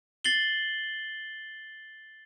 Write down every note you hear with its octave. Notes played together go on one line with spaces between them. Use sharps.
A6 C7 F#7 G7